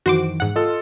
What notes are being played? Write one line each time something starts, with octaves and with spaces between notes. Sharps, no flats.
F#2 D#3 E3 F#4 C5 D6
G#2 F#5
F4 A4 D#5